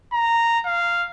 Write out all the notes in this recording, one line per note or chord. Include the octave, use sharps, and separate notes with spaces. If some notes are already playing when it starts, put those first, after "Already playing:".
A#5
F5